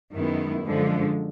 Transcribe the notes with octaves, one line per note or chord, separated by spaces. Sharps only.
F#2 D#3 G#3 B3 E4
F#2 D3 F3 G#3